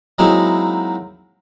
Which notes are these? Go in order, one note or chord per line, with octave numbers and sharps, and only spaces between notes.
F#3 G#3 A#3 C4 D#4 E4